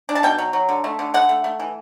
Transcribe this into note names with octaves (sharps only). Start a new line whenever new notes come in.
D4
A5
B2 G5
F#3
F#3
D3
A3
D3
D3 F#5
A3
A3
E3